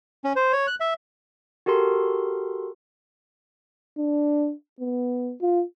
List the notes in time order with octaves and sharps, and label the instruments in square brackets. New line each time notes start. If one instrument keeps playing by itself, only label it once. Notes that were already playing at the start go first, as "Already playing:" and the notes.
[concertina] C#4
C5
C#5
F#6
E5
[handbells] F#4 G4 A4 A#4 C6
[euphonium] D4
B3
F4